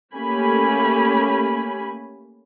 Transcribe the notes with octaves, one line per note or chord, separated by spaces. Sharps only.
A3 A#3 C#4 G4 G#5 B5